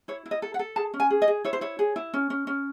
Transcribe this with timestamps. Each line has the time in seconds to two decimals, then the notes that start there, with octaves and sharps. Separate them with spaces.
0.08 E4 C#5
0.26 E4
0.31 D#5
0.42 A4
0.54 F#5
0.59 A4
0.76 G#4 A5
0.94 C#4
1.00 G#5
1.10 G#4
1.22 D#5
1.28 G#4
1.45 E4 C#5
1.53 C5
1.61 E4 C#5
1.79 G#4
1.96 E4
2.14 C#4
2.30 C#4
2.47 C#4